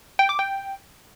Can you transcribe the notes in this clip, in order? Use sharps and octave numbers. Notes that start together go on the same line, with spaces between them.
G5
D6
G5